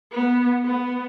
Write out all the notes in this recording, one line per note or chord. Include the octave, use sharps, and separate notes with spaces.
B3
B3